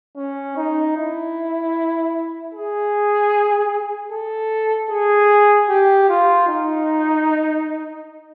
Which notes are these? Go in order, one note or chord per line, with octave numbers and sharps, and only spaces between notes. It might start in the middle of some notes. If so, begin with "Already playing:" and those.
C#4
D#4
E4
G#4
A4
G#4
G4
F4
D#4